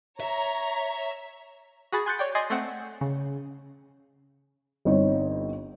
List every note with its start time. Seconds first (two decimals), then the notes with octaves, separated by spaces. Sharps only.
0.20 C#5 E5 A#5
1.92 F#4 G#4 B5 A6
2.06 G#5 C6 F#6 G6 A6 C#7
2.19 C#5 D5 G5
2.35 D5 D#5 G#5 C6 C7
2.50 A3 C4 F#5
3.01 C#3
4.85 G1 C4 D#4 C#5